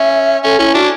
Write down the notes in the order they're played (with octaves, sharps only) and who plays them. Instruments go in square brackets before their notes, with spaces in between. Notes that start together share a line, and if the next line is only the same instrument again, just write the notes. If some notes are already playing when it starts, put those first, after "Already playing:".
Already playing: [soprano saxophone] C#4 [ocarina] E5
[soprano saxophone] C#4 [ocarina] A4
[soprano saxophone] C#4 [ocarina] E4
[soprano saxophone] D4 [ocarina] F#4